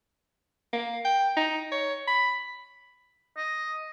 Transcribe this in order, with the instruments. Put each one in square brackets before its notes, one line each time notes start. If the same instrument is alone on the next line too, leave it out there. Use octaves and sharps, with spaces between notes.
[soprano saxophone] A#3
G5
D#4
C#5
B5
[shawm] D#5